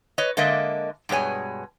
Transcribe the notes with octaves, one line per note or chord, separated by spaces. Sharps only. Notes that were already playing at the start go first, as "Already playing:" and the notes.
B4 C#5 D#5
D3 G#3 A#3 D#5 E5
G2 B2 G#3 C#5 G#5